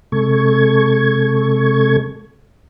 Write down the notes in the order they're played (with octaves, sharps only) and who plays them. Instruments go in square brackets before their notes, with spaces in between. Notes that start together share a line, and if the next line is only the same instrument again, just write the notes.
[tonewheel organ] C3 G#3 A4 C#6 G#6